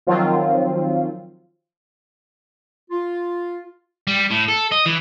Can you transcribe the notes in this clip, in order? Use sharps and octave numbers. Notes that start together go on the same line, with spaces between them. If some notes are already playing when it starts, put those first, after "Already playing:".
D#3 F3 F#3 C4 F4
F4
G3
A2
A4
D#5
E3